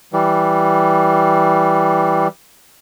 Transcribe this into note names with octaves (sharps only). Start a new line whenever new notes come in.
E3 G3